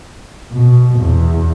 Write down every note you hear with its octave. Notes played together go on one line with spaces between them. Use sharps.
B2
E2